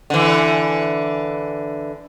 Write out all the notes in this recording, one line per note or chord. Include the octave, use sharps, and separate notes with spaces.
D3 E3